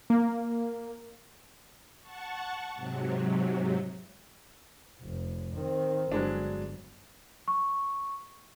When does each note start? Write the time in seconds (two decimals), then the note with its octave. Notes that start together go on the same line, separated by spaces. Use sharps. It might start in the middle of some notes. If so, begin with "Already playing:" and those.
0.10 A#3
2.01 F#5 A5 C#6
2.74 G#2 C3 F#3
5.02 F1
5.53 D#3 C4
6.12 G1 F#3 G#3 D4
7.48 C#6